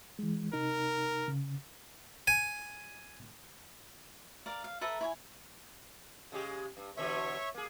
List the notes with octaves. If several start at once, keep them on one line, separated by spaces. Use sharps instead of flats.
E3 G#3
C3 D#4 A#4
C#3
G#5
A#4 D5 F5
F5
A4 B4 E5 A#5
E4 C#5 G#5
C#3 G#3 G4
G2
B2 D3 E3 C#5 E5 C#6
A#3 G#4